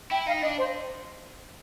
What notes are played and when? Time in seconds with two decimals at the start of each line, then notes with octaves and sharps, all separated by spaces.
0.11 E4 G5
0.27 D#4 F5
0.41 D4 D#5
0.57 C5